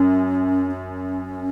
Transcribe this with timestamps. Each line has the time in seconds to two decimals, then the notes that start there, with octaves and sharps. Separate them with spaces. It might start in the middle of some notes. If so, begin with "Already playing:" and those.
Already playing: F#2 C#4
0.71 C#4